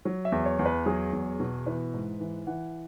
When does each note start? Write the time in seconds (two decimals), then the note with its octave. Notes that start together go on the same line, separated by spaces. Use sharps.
0.05 F#3
0.25 E5
0.32 E2
0.46 C#5
0.59 E2
0.65 B4
0.86 F#3 G#4
1.13 E2
1.40 B2
1.66 E3 B4
1.94 G#2
2.20 E3
2.47 E3 F#5